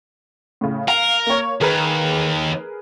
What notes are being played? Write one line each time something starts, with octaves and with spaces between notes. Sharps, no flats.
A2 C#3
A#4 F5
A#3 C#5
D#2 G#4 A#4 B4